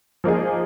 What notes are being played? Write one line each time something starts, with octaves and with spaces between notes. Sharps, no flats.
F3 A#3 D#4 G#4